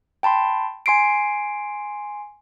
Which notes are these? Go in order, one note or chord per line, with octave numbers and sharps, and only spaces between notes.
G5 A5 B5 C6
G#5 C6 C7 D7